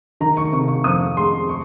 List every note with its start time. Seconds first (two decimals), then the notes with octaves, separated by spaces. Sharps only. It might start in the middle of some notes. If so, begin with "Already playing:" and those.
0.21 D#3 A#5
0.37 C#6
0.52 C3 C#6
0.68 C#6
0.84 F2 D#6
1.17 G#3 C6
1.49 C#6